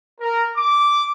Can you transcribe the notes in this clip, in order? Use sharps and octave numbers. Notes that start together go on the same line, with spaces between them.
A#4
D6